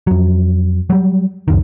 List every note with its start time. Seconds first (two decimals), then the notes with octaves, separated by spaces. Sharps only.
0.07 F2 F#3
0.90 F#3 G3
1.48 C#2 F#2 D#3